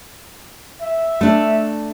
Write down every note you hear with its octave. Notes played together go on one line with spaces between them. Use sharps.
E5
A3 D4